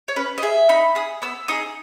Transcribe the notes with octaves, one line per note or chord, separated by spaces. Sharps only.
C#5
C#4 B4
D#5
G#4 E5
D#4 B5
G#4 D#6
B3 E6
D#4 G#4 D#6